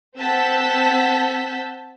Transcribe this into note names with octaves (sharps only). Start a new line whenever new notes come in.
C4 F#5 A5 E6 G6 B6